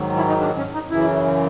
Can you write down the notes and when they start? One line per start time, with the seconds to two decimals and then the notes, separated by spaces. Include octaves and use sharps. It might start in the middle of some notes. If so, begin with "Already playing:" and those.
Already playing: G#2 D#3 F#3
0.17 E4
0.28 D#4
0.41 D4
0.57 C#4
0.74 D#4
0.91 F#2 C#3 E3 E4